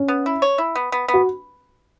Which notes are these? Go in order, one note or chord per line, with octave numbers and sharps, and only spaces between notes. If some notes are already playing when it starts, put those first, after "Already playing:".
Already playing: C#4
B3
E4
C#5
E4
B3
B3
B3
F#4